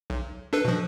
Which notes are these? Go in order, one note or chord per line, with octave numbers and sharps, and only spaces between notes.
B1
D4 A4 B4
B2 F3